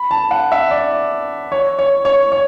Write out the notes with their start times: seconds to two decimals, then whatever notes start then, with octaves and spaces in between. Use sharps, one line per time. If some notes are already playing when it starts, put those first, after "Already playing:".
Already playing: B5
0.11 A5
0.31 F#5
0.52 E5
0.71 D5
1.52 C#5
1.79 C#5
2.05 C#5
2.32 C#5